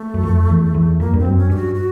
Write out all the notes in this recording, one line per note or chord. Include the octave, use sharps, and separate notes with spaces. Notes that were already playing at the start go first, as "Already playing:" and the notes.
Already playing: A3
F#2
F2
E2
E2
F2 A#3
G2
C4
F#2
C#4
G2 G4
F#4
F#4